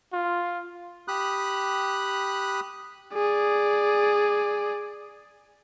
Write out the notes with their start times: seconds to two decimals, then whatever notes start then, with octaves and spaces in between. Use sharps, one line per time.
0.13 F4
1.08 G4 B5 D#6 F#6
3.14 G#4 D5